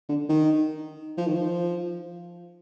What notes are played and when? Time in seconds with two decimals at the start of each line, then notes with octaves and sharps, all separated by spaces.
0.09 D3
0.29 D#3
1.17 F3
1.27 D#3
1.36 F3